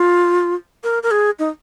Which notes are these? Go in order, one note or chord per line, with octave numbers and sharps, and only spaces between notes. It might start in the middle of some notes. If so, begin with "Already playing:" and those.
Already playing: F4
A#4
A#4
G#4
D#4